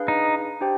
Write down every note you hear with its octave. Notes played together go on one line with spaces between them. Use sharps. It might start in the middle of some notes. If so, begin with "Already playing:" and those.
Already playing: D4 G#4 B4 F5
D#4
D4 G4 C5 G5